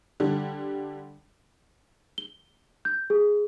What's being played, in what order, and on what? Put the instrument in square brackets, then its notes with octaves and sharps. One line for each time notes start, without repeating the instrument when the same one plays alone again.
[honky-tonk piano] D3 G3 D4
[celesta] G7
G6
G#4